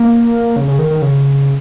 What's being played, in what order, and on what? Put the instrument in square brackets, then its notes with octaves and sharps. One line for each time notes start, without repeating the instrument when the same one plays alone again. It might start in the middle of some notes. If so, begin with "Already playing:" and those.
Already playing: [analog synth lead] A#3
C#3
C#3
D#3
D#3
C#3